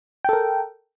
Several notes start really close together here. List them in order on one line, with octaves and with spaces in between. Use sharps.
G5 A4 A#4